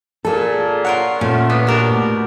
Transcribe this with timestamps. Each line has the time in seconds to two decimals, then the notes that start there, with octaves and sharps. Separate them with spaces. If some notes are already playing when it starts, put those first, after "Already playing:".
0.25 A#2 G#4 A4 A5
0.85 F4 A#4 C#5 F#5
1.21 A#2 A3 C#4 F4
1.49 B3 D4
1.67 B2 D4 F#4 G4 A#4 A5
1.90 A2